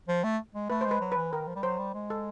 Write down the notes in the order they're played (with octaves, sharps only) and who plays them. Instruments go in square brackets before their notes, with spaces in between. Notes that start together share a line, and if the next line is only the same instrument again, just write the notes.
[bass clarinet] F3
A3
G#3
[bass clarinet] A3 [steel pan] B4
[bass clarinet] G#3 [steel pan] C5
[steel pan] B4
[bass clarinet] F#3
[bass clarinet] E3 [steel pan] B4
[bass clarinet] D#3 [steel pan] A#4
[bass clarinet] F3
G3
[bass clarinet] F#3 [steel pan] C5
[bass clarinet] G3
G#3
[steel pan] A4